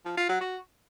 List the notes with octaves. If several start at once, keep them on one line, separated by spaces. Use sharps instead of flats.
F3
F4
F#3
F#4